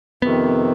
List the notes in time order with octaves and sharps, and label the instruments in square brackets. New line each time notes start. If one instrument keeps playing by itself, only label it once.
[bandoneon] F2 C3 D#3 [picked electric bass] B3